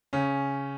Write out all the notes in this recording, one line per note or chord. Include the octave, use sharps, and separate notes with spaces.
C#3 C#4